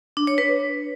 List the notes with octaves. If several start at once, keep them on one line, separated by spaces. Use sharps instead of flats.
D4
C#5
B4